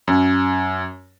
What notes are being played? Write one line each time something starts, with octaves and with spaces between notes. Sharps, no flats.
F#2